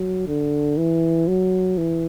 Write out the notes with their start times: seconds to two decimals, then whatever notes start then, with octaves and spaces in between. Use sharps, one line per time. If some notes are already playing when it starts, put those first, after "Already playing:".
Already playing: F#3
0.27 D3
0.77 E3
1.28 F#3
1.78 E3